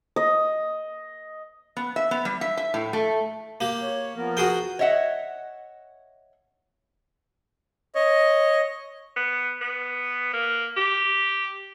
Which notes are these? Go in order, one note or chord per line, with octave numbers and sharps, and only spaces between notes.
D#5
B3
E5
B3
G3
E5
E5
A2
A3
A#3 G4
C#5
F3 B3 A#4
F#4 G#4 G5
C#5 D#5 E5 F#5
C#5 D#5
B3
B3
A#3
G4